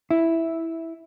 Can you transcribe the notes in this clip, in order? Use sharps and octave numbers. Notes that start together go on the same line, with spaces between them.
E4